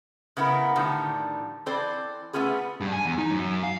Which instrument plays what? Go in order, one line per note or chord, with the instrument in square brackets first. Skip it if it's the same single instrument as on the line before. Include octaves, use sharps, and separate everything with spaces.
[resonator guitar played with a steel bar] C#3 B3 E4 G4 A#4
A2 D3 D#3 F3 G3
E3 C4 A4 C5 D5
A3 B3 C#4 F4 G#4
[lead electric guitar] G2
G#5
E2
D#4
F#2
F5